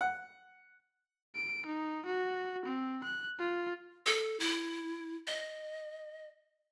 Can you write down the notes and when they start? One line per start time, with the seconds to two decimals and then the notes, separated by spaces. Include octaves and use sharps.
0.01 F#5
1.35 D7
1.66 D#4
2.06 F#4
2.66 C4
3.04 F#6
3.39 F4
4.06 A4
4.40 E4
5.27 D#5